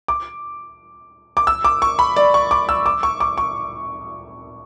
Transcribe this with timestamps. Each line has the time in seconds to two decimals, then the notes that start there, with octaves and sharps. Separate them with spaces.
0.08 D6
1.37 D6
1.47 E6
1.64 D6
1.82 C#6
1.99 B5
2.17 D5
2.34 C#6
2.51 D6
2.69 E6
2.86 D6
3.03 C#6
3.20 D6
3.38 C#6